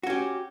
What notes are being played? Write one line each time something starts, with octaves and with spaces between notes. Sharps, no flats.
C#4 F#4 G4